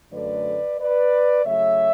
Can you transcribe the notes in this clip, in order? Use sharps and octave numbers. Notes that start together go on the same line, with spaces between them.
F#2 D3 F#3 A3 B4 D5
B4 D5
C#3 F#3 A3 C#5 E5